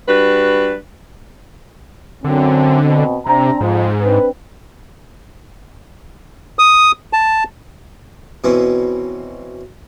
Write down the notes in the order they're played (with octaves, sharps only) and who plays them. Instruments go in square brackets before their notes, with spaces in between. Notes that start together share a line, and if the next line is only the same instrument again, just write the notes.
[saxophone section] G3 D4 F#4 B4
[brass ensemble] F#2 C4 [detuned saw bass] D3
[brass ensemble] B2 C4
[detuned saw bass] C3 [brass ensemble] C4 D4 A#5
[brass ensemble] F2 [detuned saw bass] G#2
[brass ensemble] C4 D4 B4
[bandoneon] D#6
A5
[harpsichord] B2 E3 C4 C#4